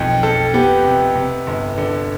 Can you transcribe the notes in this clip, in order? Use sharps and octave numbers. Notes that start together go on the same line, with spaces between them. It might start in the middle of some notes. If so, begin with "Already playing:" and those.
Already playing: B1 F2
F2 A4
B3 G4
C3
C3
G1
D3